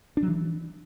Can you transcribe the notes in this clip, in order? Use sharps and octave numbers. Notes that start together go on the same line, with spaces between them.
D4
F#3
E3